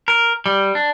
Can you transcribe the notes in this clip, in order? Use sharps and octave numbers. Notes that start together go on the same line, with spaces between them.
A#4
G3
D4